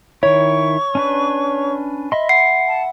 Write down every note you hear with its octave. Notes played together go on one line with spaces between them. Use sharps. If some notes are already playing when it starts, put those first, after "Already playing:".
D#3 E4 C#5 C#6
C#4 D4 B4
D#5 E5 B5 C6
F#5 C7
A5